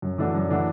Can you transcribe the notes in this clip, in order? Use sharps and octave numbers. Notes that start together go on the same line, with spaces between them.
F#2
E3 A3 D4 F#4
F#2
E3 A3 D4 F#4